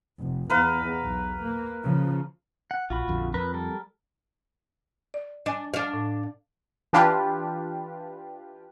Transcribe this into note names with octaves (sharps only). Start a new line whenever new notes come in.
F1
E2 A#4 B4 F5
B1
A#3
C#3 F3
F#5
A#1 F4 F#4 B5
A#1 F2 D3
F2 A#4 B4
G3 A4 A#4
D5
D4 D#5 G#5
D4 D#5 F5
A2
E3 D4 F4 G4 B4